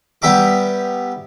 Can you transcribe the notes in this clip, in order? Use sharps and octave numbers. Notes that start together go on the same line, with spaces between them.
G3 B3 G4 E5 A#5 D6